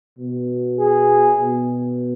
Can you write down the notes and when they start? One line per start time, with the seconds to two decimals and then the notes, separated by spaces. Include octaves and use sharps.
0.19 B2
0.78 G#4
1.38 B2